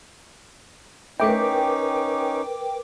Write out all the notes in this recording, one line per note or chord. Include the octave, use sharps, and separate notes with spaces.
A3 C#4 D#4 E4 A#4 B4 G5 D6